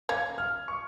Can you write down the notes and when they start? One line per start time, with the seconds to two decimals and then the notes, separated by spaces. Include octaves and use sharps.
0.09 A#3 C#4 G#6
0.38 F6
0.68 C#6